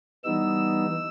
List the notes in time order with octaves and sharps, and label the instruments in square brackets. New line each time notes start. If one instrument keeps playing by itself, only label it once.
[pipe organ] E3 G3 B3 D#4 E6